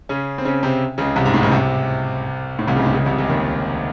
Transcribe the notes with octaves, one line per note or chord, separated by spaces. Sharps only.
C#3 C#4
C4
C#3 C#4
C3 C4
C#2 C#3
C2 C3
G#2
A2
C#2 C#3
C2 C3
A2
C2 C3
C#2 C#3
A2
C#2 C#3
C2 C3
C#2 C#3
D#2 D#3